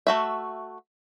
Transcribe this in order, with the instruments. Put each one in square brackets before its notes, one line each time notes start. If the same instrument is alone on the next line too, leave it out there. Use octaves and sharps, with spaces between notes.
[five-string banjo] A3 F#4 E5